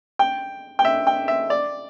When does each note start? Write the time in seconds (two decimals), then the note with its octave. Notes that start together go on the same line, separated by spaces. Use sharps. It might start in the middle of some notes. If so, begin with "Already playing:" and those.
0.19 G5
0.79 G5
0.85 E5
1.07 G5
1.28 E5
1.50 D5